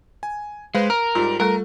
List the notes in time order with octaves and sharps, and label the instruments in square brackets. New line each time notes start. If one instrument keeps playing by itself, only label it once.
[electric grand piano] G#5
[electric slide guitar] G#3 [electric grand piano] B4 C5 F5
[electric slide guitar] A#4 [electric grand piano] F6
[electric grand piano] G#2 G3 [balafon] F4
[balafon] G3 A4 [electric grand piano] A3 [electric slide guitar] A#4